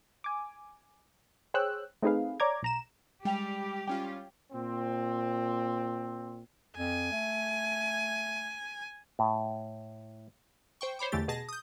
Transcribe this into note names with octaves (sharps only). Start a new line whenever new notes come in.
G#5 D6
G#4 C5 C#5 G5 E6 F#6
A3 C4 D#4 G#4 B4 F5
C#5 D5 A#5 D6 G#6
B1 A#5 E7
G3 G#3 G4 G5 F7
G3 C#4 F4 G5
A#2 C4
F2 G#5
A3
A2
C5 G5 C#6
C5 C#5 B5 D6
E2 D3 E3 A3 G4 A6
B2 G#4 A5 A#6
D#6 G6